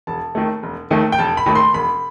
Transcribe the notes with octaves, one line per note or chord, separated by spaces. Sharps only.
E1 A5
D#2 D#3 A3
E1
D#2 D#3 A3
G5
E1 A5
B5
D#2 D#3 A3
C6
E1 B5